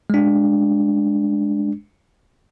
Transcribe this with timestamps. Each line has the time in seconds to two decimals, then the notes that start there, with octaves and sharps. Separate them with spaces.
0.10 G#3 D4